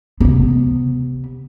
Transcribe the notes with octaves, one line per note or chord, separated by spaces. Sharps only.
C3 B3